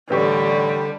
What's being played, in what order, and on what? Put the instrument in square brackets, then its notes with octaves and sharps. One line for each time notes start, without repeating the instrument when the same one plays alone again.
[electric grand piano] A1 G4 C#6 [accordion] D3 [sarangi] G3 [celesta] B4